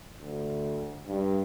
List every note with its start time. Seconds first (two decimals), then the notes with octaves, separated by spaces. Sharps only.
0.21 D2
1.07 G2